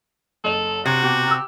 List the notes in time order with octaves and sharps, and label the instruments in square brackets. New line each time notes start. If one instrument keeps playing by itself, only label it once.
[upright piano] F#1 D#5 F7 [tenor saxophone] A4
[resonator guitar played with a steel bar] C3 [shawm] F#4
[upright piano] B2 [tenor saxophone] G4
[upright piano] E6 F6